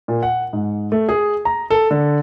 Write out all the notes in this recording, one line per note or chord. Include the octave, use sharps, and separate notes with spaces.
A#2
F#5
G#2
A3
G#4
A#5
A4
D3